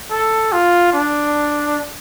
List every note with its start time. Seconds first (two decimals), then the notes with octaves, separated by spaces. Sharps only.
0.11 A4
0.52 F4
0.93 D4